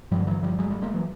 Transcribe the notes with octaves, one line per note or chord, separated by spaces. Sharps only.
G2 D3 F3 G3
E3 F#3
F3 G3
F#3 G#3
G3 A3
G#3 A#3
E3 F#3